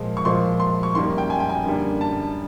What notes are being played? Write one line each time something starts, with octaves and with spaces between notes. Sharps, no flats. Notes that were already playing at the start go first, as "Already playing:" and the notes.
Already playing: A#2 F3 G#3
C#6
A#2 F3 G#3 C6
C6
C#6
F#2 D#3 G3 A#3 C6
G5
G#5
G5
G#5
F#2 D3 G3 A#3
A5